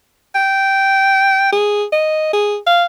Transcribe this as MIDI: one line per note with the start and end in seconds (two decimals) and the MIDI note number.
0.35 1.52 79
1.52 1.84 68
1.92 2.31 75
2.33 2.57 68
2.66 2.85 77